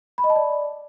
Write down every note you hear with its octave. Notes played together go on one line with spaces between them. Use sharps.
B5
D#5
A5
D5